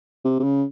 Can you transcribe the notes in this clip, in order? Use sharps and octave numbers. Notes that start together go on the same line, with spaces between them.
C3
C3
C#3